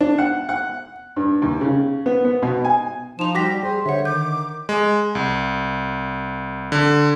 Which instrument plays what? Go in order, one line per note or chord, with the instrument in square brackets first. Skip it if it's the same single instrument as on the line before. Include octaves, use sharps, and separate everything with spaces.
[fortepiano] D4
F#5
F#5
G2
D#2
C#3
B3
B3
B2
G#5
[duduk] F3 [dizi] D#4 [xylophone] E7 F7
[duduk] G3 [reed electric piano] F#4 D5 [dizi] G5 [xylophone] D6 A#6 B6
[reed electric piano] G3 [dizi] G#4 [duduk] C5
[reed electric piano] D3 [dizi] C#5 [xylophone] E5 F#5
[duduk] D#3 [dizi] D6 [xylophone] G6
[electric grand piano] G#3
C2
D3